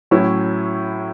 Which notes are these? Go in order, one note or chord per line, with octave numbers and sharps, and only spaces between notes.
A2 F#3 C#4 E4